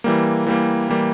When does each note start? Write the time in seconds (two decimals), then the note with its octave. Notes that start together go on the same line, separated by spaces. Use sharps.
0.04 E3 G3 A#3
0.47 E3 G3 A#3
0.89 E3 G3 A#3